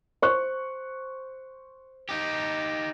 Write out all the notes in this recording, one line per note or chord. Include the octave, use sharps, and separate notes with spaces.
C5 C#6 F#6
D#4 G4